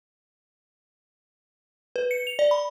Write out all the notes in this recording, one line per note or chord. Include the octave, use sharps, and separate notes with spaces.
B4
C#7
F7
D5
B5